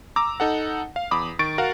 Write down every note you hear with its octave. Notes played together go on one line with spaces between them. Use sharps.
A#5 D6 E6
D#4 A4 F#5
F5
E2 B5 D6 D#6
D#3 C#6 A6 D7
F#4 A#4 F5 F#5